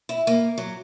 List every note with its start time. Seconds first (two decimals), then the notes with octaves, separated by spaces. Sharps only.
0.09 E4
0.27 A#3
0.58 F#3